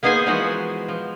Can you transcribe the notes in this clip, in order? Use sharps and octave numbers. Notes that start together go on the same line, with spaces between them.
A#3 B3 D#4 G#4 C5 G#5
E3 F3 G#3 B3 D#4 F#4
F3